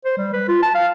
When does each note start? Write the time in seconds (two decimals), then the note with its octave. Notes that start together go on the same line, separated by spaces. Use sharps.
0.05 C5
0.17 G3
0.33 B4
0.48 F4
0.63 A5
0.75 F5